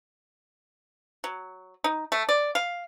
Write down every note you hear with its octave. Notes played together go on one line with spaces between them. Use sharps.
F#3
D#4
A3
D5
F5